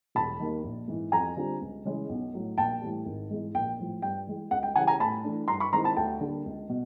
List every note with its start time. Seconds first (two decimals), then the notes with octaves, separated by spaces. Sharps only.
0.15 E1 A5 B5
0.40 D#2 D#3
0.63 A#1
0.88 G#2 E3
1.12 F2 G#5 A#5
1.37 D3 G3 C4 F4
1.61 C#2
1.85 C#3 E3 G#3
2.09 B1
2.34 A2 F#3
2.57 A#1 G5 A5
2.81 A2 E3 G3
3.06 G#1
3.30 G#2 E3 G#3
3.54 A#1 G5
3.78 A2 F3
4.02 G2 G5
4.27 E3 G#3
4.51 C#2 F#5
4.63 G5
4.76 C#3 E3 G3 F#5 G#5
4.87 G#5 A#5
5.00 A2 A5 B5
5.24 E3 A3 D4
5.48 G2 A#5 C6
5.60 B5 C#6
5.72 D#3 G#3 C4 E4 A#5 C6
5.84 A5 B5
5.96 D2 G5 A5
6.21 D3 G3 A#3
6.45 C#2
6.69 B2